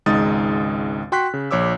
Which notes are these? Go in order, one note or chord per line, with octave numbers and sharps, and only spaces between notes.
G#1 C#2 G#3 D#4 D#6 A6
F#4 G5 C6 C#6 F#6 B6
C#3
A#1 C#5 D6 E6